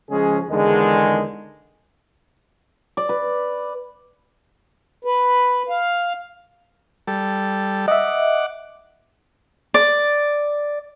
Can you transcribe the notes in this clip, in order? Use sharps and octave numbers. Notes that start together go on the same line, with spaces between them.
C#3 F3 G#3 C#4 G#4
E2 D3 D#3 G#3
D5
B4
B4
F5
G3 A4
D#5 E5 F#5 D6
D5